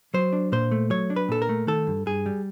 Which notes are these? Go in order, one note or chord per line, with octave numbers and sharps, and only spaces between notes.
F#3 C5
D4
A#2 C5
A3
F#3 C#5
D4
B4
A#2 A4
A#4
A3
D#3 A4
G2
G2 G#4
G3